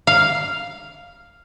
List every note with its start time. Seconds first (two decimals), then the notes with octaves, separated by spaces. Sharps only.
0.07 F5